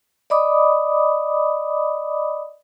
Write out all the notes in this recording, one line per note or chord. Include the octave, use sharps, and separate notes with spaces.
D5 D#5 B5 D6 D#6